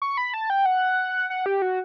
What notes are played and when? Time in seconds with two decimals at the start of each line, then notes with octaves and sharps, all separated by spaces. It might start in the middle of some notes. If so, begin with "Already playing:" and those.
0.02 C#6
0.17 B5
0.34 A5
0.50 G5
0.65 F#5
1.30 F#5
1.46 G4
1.62 F#4